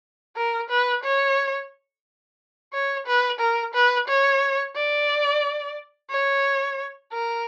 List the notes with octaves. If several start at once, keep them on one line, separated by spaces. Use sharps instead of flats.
A#4
B4
C#5
C#5
B4
A#4
B4
C#5
D5
C#5
A#4